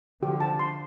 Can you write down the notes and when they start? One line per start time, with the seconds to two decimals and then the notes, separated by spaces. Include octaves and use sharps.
0.23 D3 F3 G4
0.40 A5
0.59 C6